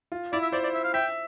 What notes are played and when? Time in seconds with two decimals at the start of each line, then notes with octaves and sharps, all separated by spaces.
0.12 F4
0.32 E4 D5
0.42 E5
0.52 C5 D5
0.63 D5
0.74 E5
0.84 F5
0.94 E5 G5